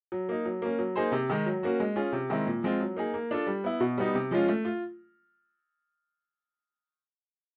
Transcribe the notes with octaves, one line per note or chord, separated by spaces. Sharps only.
F#3
A#3 D#4
F#3
A#3 C#4
F#3
A#3 D#4 G#4 C5
C3
D#3 G#3
F#3
A#3 C#4 F#4
G#3
C#4 F4 G#4
C3
D#3 G#3 C4 E4
A#2
F3 G#3 C4 F4
F#3
A#3 D#4 G#4
A#3
D4 F4 A4
G3
B3 E4
B2
G3 B3 D#4
C3
F3 G#3 C#4 F4
A3
F4